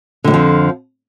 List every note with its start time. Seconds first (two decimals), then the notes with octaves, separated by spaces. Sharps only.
0.24 D3
0.28 G#2
0.31 F2
0.34 F3